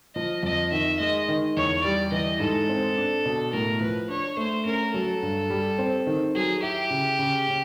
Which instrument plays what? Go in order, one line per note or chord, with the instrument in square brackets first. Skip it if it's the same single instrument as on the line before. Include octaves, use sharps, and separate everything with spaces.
[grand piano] F3 [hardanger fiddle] D#5
[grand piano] F2 [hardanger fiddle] D#5
[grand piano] D#3 [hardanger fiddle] E5
[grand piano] G#3 [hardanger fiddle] D#5
[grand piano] D#3
[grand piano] E2 [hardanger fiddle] C#5
[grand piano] G3 [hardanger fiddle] D5
[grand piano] E3 [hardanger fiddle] D#5
[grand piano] G#2 [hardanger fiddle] A4
[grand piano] C4
D4
B2
[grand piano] A2 [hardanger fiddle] A#4
[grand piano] F3 [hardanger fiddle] B4
[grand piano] D4 [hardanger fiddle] C#5
[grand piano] A3 [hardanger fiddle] C5
[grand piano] C#4 [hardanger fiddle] A#4
[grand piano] F#3 [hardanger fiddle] A4
[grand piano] G2
G3
C4
D#3
[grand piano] F#3 [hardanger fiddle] G#4
[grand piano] E4 [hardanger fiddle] G4
[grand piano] C#3
C#3
C#4